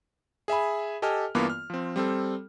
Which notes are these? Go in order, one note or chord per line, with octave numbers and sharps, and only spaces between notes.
G#4 E5 G#5 B5
G4 A4 D#5 G#5 A5 F6
G2 E3 A#3 B3 F4 D6
F6
F3 C4
G3 C4 A4